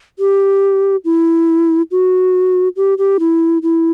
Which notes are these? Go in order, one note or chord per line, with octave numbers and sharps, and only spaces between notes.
G4
E4
F#4
G4
G4
E4
E4